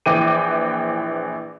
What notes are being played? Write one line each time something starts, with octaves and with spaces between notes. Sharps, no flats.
A#1 E3 G5 D6 D#7